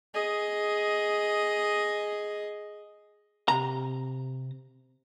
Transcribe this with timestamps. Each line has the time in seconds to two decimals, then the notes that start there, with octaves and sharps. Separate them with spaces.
0.14 G#4 D#5
3.48 C3 A#5